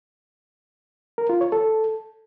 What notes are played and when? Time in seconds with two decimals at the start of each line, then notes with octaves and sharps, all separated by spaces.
1.18 A#4
1.29 F4
1.41 C#5
1.52 A4